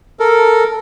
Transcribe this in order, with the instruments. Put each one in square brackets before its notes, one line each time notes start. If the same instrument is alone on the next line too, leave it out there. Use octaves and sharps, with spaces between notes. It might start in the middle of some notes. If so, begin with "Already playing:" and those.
[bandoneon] A4 A#4